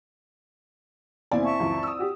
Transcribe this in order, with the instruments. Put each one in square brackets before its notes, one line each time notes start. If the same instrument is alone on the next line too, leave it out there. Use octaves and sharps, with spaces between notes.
[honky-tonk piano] D#2 B2 G#5 [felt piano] C4 E4 D5
[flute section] E5 A5 C#6
[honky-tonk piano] C#2 F#2 E3
D#6 E6
F#4 G4